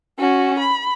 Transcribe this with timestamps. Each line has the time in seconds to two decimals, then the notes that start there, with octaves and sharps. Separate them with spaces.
0.19 C#4 F#4
0.59 B5